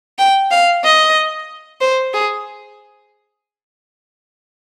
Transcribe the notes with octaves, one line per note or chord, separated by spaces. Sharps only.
G5
F5
D#5
C5
G#4